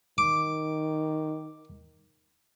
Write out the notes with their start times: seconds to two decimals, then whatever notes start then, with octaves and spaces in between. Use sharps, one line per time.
0.18 D#3 D6